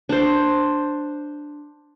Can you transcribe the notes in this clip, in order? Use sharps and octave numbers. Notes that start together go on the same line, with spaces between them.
D4 C5